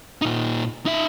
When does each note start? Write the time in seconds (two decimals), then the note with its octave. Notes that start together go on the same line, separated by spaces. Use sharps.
0.22 A#2 D#4
0.86 D#4 E5